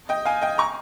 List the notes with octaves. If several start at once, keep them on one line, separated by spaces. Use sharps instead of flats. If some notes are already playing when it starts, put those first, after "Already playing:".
D#5 G5
F5 G#5
D#5 G5
A#5 C#6